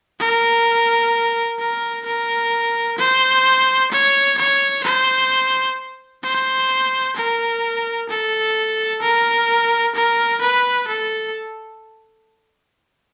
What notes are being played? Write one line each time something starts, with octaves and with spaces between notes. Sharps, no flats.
A#4
A#4
A#4
C5
C#5
C#5
C5
C5
A#4
A4
A#4
A#4
B4
A4